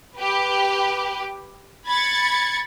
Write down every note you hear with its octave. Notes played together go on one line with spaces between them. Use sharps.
G4 B4
B5 G#6 A6 C#7